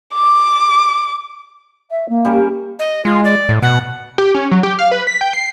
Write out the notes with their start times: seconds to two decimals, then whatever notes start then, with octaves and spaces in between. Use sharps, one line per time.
0.14 D6
1.90 E5
2.08 A#3
2.25 G3 C#4 A#4
2.79 D#5
3.05 G#3 F4
3.24 D5
3.49 A2
3.62 B2 F#5
4.18 G4
4.34 C#4
4.51 F#3
4.63 G4
4.79 F5
4.91 B4
5.07 B6
5.21 G5
5.33 C7